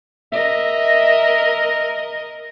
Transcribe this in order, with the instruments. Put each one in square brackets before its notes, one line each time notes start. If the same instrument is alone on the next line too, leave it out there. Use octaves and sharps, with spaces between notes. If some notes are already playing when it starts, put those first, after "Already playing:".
[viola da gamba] A#4 D#5 [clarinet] E5